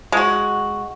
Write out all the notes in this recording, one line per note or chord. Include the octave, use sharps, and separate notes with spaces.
G#3 F#4